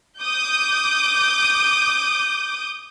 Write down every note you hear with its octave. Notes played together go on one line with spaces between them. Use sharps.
D6 D#6 G6